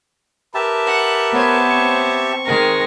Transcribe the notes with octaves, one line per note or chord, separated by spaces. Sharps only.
G4 A#4 B4 E5 A5
F#5
B3 C5 C#5
C4 C#6
D#3 G#3 A#4